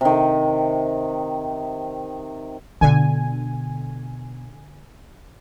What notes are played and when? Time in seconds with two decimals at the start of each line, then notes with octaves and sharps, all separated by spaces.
0.01 C3 D#3
2.81 B2 D3 G#5